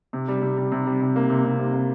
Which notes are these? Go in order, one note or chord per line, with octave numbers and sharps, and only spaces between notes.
C3
G3
C3
G3
C3
G3
C3
A#3
C3
C3
C3
A#3